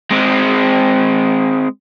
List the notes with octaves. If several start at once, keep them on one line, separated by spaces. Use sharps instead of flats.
G#3 C4